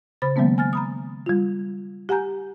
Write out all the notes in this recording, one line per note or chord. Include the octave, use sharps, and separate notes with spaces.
C#3 C5 B5 A6
D#3 F#3 G#3 A#3 B3 C#4
G#5 F6 A6
A#5 B5 D#6
G3 F4
G4 F#5 G#5 A#5 G6